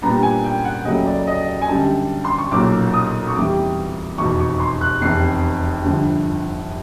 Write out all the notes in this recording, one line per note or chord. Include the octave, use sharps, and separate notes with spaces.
A#2 G3 B3 D4 A#5
G#5
G5
F#5
D#2 C#3 F#3 A3 D#5
D5
D#5
D#5
G#5
F#2 D3 G3 A5
C6
C#6
B1 A#2 F#3 D6
D#6
C#6
E2 C3 E3 G3 D6
F1 E2 B2 C#6
C#6
C6
F#6
F1 E2 C3 C7
G1 G2 D3 F3